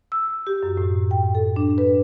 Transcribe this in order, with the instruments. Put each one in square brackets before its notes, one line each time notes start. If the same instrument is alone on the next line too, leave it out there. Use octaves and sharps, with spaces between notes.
[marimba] E6
G4
F#2
A2
G5
A4
D4
B4